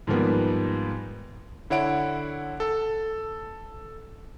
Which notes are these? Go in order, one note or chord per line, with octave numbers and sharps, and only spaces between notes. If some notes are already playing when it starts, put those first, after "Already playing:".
G#2 D#3 F3 G3 A#3 B3
D3 E4 C#5 F#5 D7
A4 A5